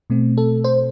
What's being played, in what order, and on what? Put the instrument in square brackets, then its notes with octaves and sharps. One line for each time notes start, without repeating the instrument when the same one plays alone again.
[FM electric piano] B2 A3 C4
A4
C5